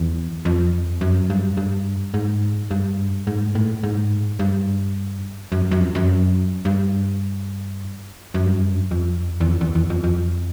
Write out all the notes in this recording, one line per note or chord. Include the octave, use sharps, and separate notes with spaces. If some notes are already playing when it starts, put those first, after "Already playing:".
Already playing: E2
F2
F#2
G2
G2
G#2
G2
G#2
A2
G#2
G2
F#2
F#2
F2
F#2
G2
F#2
G2
F#2
F2
E2
F2
E2
E2
F2
F2